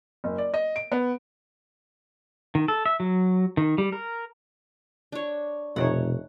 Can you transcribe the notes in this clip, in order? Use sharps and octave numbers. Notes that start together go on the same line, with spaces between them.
F#1
D5
D#5
D7
B3
D#3
A4
E5
F#3
D#3
G3
A#4
D4 C#5
F1 B2 A3 D#4 C#5 F#5